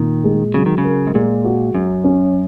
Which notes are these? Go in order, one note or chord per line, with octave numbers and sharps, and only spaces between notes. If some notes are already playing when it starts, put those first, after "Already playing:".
Already playing: A#2 D#3
G#3
C#3 F#3
D#3
C#3
A#4
G#2
A#2 G#3
F#4
F#2 C#4
C#4